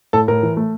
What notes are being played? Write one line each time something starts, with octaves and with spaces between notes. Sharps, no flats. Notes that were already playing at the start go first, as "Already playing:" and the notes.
A2 A4
A2 A#4
E3
A3